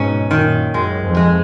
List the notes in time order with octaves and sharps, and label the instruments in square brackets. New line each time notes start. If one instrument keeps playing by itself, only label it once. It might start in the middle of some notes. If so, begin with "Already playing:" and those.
Already playing: [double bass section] G#2 B2 [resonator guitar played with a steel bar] C#4 D#4
[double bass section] F#2 A#2 [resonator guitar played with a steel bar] D#3
[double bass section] F#2 [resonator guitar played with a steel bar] G#3
[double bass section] F2
[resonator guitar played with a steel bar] G#3